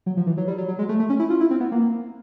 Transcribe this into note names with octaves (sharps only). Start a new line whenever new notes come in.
F#3
F3
E3
F#3
G3
F#3
F#3
G#3
A3
A3
C#4
E4
F4
E4
C4
B3
A#3